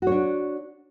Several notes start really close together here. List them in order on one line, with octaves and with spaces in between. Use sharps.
F#4 C#5 D4